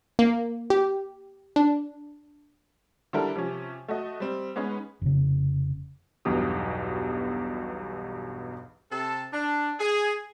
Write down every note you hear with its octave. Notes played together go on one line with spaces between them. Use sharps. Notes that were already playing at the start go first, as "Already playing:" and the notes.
A#3
G4
D4
D3 G3 E4 A4 A#4
C3 F3 C#4
A3 F#4 D#5
G3 C4
G#3 B3 C#4 D#4
F1 C#3
B1 E2 G2 B2 G4 D#6
C3 A4
D4
G#4